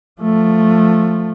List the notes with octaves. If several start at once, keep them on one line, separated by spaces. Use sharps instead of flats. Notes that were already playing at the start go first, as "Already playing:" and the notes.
F3 A3